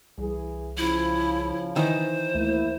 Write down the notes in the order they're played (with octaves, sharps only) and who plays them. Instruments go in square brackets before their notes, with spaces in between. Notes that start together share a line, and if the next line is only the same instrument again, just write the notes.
[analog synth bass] C2 [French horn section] E3 G#4
[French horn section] C#3 F3 [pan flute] E4
[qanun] D#3 E3 [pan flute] C5
[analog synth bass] D2 [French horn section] A#3 E4